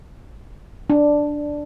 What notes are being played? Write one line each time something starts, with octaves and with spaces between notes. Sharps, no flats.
D4